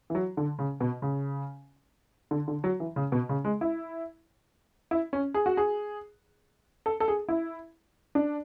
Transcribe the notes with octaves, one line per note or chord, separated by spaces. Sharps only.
E3
F#3
D3
C#3
B2
C#3
D3
D3
F#3
E3
C#3
B2
C#3
G#3
E4
E4
C#4
G#4
F#4
G#4
A4
A4
G#4
E4
D4